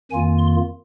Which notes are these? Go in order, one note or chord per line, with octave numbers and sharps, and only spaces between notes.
F2 D#3 A#3 F4 G#5
C6